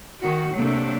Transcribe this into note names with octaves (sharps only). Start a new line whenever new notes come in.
D#3 F#4
C3 F#3 A3 A#3 D4